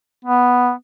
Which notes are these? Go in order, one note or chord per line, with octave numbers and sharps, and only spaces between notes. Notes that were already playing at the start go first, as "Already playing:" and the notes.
B3